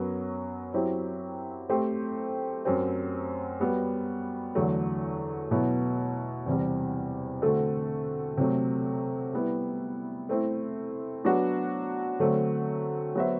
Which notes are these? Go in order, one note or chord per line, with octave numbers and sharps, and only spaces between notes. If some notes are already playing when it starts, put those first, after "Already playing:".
Already playing: F#2 F#3 B3
F#3 C4 E4 G4
A3 C4 G4 C5
F#2 F#3 C4
G3 B3 F#4
E2 D3 F#3 A3
B2 F#3 B3 E4
E2 C3 G3
D3 A3 C4 F#4 A4
C3 F#3 A3
G3 B3 E4
A3 C4 E4
F#3 B3 D4 F#4
D3 F#3 A3 C4 F#4
F#3 B3 F#4 C5 E5